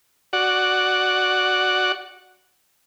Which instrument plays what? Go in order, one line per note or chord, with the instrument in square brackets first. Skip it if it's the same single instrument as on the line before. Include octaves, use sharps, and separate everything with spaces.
[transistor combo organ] F#4 D5 F#5